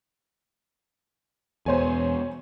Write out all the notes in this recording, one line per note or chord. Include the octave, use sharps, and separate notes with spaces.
E2 B2 C5 C#5 G#5